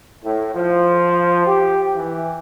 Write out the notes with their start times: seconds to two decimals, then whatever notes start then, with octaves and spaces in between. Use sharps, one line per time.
0.23 A2
0.54 F3
1.46 G4
1.95 E3